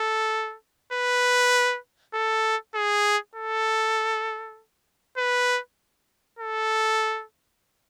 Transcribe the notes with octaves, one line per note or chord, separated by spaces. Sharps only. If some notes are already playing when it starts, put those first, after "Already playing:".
Already playing: A4
B4
A4
G#4
A4
B4
A4